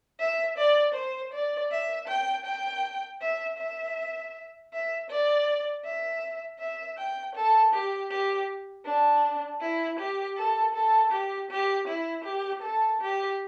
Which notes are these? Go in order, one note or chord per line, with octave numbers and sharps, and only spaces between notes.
E5
D5
C5
D5
E5
G5
G5
E5
E5
E5
D5
E5
E5
G5
A4
G4
G4
D4
E4
G4
A4
A4
G4
G4
E4
G4
A4
G4